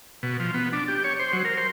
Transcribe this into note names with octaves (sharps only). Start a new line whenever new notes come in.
B2
F3
B3
D4
G4
C#5
C5
F#3
A#4
C5